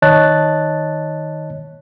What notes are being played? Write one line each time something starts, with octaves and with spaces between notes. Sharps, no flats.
D#3 C#5 D#5 A5 F#6 A6